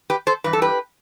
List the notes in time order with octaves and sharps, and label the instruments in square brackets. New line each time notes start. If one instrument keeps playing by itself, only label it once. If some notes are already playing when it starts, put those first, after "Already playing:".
[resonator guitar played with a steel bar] G4 B4
A4 C5
G2 E3 B4
A4
G4 B4